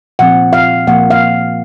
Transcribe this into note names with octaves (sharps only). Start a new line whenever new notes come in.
A#2 F3 C4 F#5
F5
A#2 F3 A#3 F#5
F5